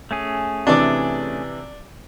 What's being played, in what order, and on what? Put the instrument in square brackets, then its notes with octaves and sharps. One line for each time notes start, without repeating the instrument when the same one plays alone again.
[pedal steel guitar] A3 C#4 G#4
[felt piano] C3 E3 [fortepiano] D4 D5